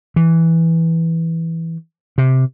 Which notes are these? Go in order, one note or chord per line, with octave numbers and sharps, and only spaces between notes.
E3
C3